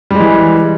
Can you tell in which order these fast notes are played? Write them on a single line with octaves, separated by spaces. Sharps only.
G3 G#3 E3